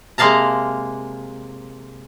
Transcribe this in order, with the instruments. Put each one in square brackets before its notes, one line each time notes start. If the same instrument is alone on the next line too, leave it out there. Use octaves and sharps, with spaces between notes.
[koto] C3 G#3 A#3 F5 A5 A#5